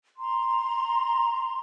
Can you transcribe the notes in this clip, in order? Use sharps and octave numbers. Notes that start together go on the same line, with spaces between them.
A#5 C6